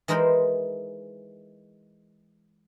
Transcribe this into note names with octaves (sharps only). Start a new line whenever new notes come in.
E3 G#3 D#4 A#4 C5 B5